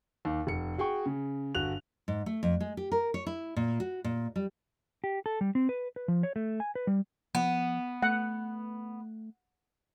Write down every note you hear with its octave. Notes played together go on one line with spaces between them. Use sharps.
D#2 D#3
F1 C#7
F#4 G#4 G5 C#6
C#3
G1 F#4 F#6 F7
G#2
A3
F2
G#3
G4
A#4
C#5
E4
A#2
F#4
A#2
G3
G4
A4
G3
C4
B4
B4
F3
C#5
A3
G#5
B4
G3
F3 B3
A3 F#5